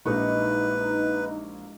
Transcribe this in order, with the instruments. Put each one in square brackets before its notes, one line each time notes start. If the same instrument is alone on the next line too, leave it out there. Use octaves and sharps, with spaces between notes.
[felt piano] A#1 A#3 C#6 [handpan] G#3 E4 G4 [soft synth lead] D#4 [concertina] B4